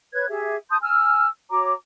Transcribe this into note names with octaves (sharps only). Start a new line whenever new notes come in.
B4 C#5 F#6 G#6
G4 G#4 E5
A5 C6 D#6 G6
G#5 E6 F6
F#4 C#5 A#5 D6